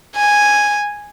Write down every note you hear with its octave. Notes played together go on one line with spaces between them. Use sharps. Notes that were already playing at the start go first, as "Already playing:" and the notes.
G#5